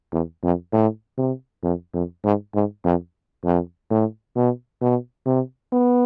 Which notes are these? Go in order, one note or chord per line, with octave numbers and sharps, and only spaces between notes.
E2
F2
A2
C3
F2
F2
G#2
G#2
F2
F2
A2
B2
B2
C3
B3